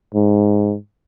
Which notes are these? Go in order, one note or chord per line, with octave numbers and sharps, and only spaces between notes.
G#2